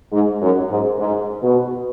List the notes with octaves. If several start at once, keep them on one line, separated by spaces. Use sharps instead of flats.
G#2
F#2
G#2
G#2
B2